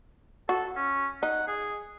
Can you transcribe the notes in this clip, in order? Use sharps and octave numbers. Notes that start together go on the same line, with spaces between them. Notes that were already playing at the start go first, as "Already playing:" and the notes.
F#4 A4
C#4
D#4 F#5
G#4